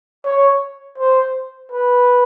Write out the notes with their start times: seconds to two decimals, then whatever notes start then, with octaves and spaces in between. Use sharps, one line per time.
0.25 C#5
0.98 C5
1.72 B4